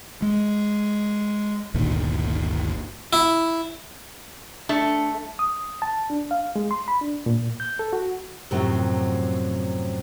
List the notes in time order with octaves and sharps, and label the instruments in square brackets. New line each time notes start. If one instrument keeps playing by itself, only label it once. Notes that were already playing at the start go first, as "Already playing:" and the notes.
[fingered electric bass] G#3
G1 D2 A#2 D#3
[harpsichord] E4
[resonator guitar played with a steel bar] A3 [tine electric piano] D4 C#7
[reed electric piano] D#6
A5
D4
F5
G#3
C6
B5
D4
A#2
G6
A4
F#4
[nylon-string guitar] F#2 A2 C3 F3 F#3